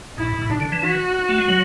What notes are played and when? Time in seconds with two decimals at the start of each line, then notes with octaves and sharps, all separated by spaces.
0.17 G#2 E4
0.25 A2
0.34 G#2
0.42 A2
0.50 B2 D4
0.60 D3
0.72 E3
0.83 F#4
1.29 A3
1.38 G#3
1.48 F#3